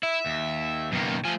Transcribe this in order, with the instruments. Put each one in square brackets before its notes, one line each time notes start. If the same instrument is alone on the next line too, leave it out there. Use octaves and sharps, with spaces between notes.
[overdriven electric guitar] E4 [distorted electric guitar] E5
[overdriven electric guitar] D#2
[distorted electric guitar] F#2 A#3 [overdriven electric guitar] B2 D#3
[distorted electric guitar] F3 [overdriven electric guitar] A3 G#5